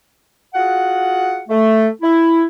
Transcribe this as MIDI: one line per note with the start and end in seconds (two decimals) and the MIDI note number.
0.54 1.41 65
0.54 1.41 66
0.54 1.41 68
0.54 1.41 78
1.48 1.88 57
2.01 2.45 64